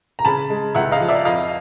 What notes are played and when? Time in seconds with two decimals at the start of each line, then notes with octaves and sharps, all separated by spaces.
0.19 A#5
0.25 C#3 A5 B5
0.50 G#3
0.75 C#2 E5 F#5
0.91 D#5 F5
1.00 F3
1.09 D5 E5
1.25 F2 D#5 F5